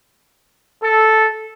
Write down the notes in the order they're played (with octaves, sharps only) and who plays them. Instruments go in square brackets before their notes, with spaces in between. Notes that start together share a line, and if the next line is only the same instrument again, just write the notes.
[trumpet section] A4